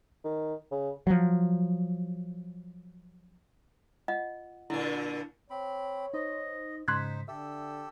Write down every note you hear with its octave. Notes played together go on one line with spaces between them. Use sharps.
D#3
C#3
F3 F#3
F4 D#5 F#5
A#2 D3 E4
C4 C#5 B5
D#4 C5 D#5
G#2 C#3 D#4 C5 C6 F#6 G#6 B6
D3 G4 A4 E5 E6